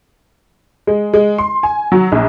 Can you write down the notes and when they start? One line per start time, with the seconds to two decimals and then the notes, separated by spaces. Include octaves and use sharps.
0.87 G#3
1.14 G#3
1.38 C6
1.63 G#5
1.92 F#3
2.12 A#1